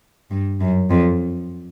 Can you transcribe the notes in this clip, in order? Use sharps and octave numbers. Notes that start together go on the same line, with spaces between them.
G2
F#2
F2